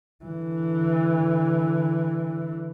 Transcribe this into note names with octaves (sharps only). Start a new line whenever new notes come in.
D3 E3